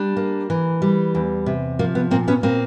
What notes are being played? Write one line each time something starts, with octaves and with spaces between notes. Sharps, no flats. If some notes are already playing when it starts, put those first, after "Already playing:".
Already playing: G3 D4
A#3
E3
G3
E2
C3
F3 A#3
B3
A#2 A#3 C4
B3 C#4
A#2 A#3 C4